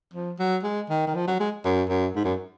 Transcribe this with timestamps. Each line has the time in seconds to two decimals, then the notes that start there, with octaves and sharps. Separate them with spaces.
0.14 F3
0.39 F#3
0.63 G#3
0.90 D#3
1.07 D#3
1.15 F3
1.27 F#3
1.40 G#3
1.65 F#2
1.89 F#2
2.16 G#2
2.24 F#2